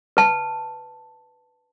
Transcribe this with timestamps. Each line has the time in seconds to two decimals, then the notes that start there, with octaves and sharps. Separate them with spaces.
0.17 B4 A5